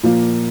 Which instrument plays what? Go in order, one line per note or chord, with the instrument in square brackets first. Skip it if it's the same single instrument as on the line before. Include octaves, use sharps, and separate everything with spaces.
[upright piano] A#2 F3 A#3